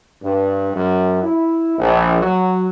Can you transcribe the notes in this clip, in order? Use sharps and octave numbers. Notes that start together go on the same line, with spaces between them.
G2
F#2
E4
A#1
F#3